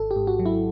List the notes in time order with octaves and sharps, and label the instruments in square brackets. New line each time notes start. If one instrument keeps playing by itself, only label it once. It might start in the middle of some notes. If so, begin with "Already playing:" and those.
Already playing: [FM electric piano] G#1 A4
G4
G#2
F#4
F#3
E4